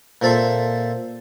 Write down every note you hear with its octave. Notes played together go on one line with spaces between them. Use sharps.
A#2 C4 A4 E5 C6